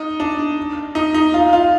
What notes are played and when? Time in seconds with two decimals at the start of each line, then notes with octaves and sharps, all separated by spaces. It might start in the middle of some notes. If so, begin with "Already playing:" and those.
Already playing: D#4
0.20 D4
0.95 D#4
1.14 D#4
1.34 F4
1.53 F4